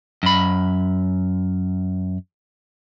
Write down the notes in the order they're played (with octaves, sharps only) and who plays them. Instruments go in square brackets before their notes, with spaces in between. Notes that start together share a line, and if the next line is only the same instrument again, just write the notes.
[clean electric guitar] F#2 B5